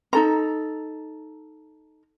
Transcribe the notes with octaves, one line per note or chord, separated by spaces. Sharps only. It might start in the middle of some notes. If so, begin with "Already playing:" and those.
D#4 A4 A#5